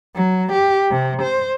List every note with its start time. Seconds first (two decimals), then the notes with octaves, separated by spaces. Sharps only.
0.15 F#3
0.53 G4
0.91 C3
1.23 C5